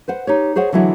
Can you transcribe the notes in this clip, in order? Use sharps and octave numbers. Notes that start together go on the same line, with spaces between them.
B4 C5 F#5
D#4 G4 C#5
G#4 C5 C#5 D#5 F#5
D3 E3 F#3 G#3 E4